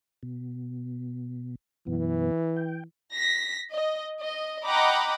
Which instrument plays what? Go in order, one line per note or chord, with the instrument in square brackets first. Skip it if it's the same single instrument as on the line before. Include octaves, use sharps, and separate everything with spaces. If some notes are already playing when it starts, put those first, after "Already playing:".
[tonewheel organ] B2
[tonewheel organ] F#2 B2 B3 [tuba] E3
[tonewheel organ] G5
[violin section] A#6 B6
D#5
D#5
D#5 F#5 G5 A#5 B5 D6